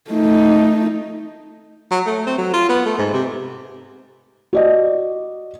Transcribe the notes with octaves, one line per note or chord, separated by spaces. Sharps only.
A3 D#4
F#3
A3
C4
F#3
F4
B3
A3
G#2
C3
F#4 D5 D#5